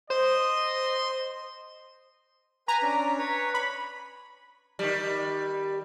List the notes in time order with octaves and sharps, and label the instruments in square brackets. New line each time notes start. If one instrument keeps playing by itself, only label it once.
[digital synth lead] C5 [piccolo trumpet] D#5 [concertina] C6
[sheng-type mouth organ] B4 G#5 [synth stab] A#5
[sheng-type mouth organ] C#4 D4
B4 C#5
[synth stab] B5
[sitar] D#3 G3